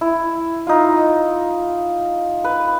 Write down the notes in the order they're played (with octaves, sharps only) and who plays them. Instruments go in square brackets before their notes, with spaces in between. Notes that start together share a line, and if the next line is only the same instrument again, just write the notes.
[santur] E4
D#4 F4
B4